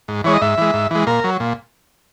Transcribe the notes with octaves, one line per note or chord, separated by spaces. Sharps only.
G#2
E3 G#3 C#5
D#5
G#2 E5
E3 G#3
G#2
E3 G#3
A#2 A#4
F#3
A#2